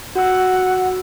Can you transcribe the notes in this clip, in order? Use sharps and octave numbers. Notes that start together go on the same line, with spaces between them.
F#4 F#5 E6